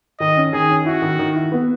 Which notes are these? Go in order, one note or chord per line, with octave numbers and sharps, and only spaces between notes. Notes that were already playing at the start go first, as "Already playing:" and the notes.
D#3 D#5
C#4
D#3 G#4
C#4
E4 F#4
D#3
D#3
E4
B3